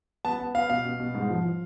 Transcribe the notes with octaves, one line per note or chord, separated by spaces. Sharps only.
B3 A5
B3
B3 F5
B2 F5
B2
B2
G#2
F3
F3